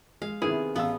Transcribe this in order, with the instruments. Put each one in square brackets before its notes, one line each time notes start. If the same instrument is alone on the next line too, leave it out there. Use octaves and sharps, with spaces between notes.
[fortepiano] G#3 [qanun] F5
[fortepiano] C3 D#3 B3 [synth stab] E4 [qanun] G#4
[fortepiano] A1 E6 [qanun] B3 [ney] F5